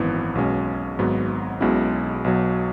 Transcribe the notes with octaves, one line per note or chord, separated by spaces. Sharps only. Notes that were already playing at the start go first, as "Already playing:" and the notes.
Already playing: G#1 F#2 E3 B3 E4
B1 B2 G#3 C#4
G#1 G#2 F#3 B3
B1 B2 G#3 C#4 E4
B1 B2 F#3